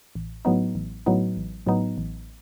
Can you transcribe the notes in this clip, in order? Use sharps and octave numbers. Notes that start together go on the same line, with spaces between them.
A1
A2 F#3 B3 D#4
A1
A2 F#3 B3 D#4
A1
A2 F#3 B3 D#4
A1